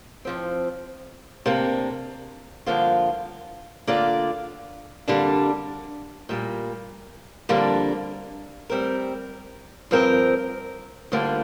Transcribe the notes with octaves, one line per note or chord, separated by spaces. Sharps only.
F2 F3 C4
C3 A#3 D4
G2 D3 F3 A#3 F4
D3 A#3 F4 D5
F2 D3 G3 A#3 D4
A#2 G3 A#3
F2 D3 G3 A#3 D4
G3 C4 A#4
G2 F3 C4 A#4
D2 D3 G3 A#3 F4